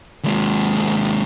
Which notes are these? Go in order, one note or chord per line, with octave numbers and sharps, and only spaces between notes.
D#2 G#3